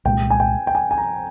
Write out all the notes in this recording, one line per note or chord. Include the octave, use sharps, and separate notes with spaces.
C2 A#2 G#3 G5
G#5
G5
G5
G#5
G#5
A#5